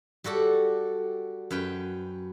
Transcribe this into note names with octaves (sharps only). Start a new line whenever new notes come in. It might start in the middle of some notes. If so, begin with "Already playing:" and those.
G3 F#4 A4 D5
F#2 B4 G5